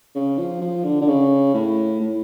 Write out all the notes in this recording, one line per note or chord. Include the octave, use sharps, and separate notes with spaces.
C#3
F3
F3
D3
D3
C#3
A2
A2